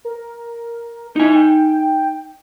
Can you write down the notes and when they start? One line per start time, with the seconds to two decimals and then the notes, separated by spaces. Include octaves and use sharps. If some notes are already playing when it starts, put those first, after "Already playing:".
0.05 A#4
1.16 D#4 E4 G#5
1.35 G5